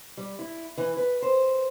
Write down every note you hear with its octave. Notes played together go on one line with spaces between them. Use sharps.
G3
E4
E3
B4
C5